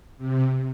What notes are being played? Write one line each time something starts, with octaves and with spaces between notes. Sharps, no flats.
C3